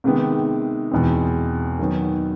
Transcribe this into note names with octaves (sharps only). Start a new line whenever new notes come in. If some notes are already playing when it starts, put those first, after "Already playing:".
C3 D#3 G#3 B3
E2 B2 G#3 C4
D#3 F#3 B3